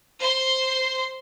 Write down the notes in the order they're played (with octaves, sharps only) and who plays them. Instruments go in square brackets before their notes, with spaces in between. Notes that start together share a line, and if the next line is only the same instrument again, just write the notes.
[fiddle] C5 C6